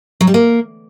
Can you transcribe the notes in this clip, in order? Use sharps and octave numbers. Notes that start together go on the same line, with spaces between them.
F#3
G3
A#3